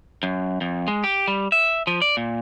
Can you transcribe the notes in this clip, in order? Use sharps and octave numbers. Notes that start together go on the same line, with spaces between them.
F#2
F2
G#3
G4
G3
E5
F3
D5
A#2